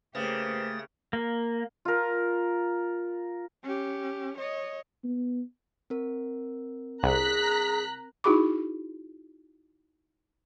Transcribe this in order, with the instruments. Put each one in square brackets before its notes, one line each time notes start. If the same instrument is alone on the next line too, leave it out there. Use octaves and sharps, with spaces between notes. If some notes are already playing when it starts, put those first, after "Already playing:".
[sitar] C#3 [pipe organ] A3 D#6 A6 [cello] A#3 G4 [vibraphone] B4 C5
[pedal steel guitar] A#3
[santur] F4 A#4
[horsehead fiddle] C#4 G4
C#5 D#5
[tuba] B3
[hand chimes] C4 A#4
[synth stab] C2 [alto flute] G#4 [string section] A#5 F#6 B6
[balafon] D#4 E4 F#4 G#4 B5 D6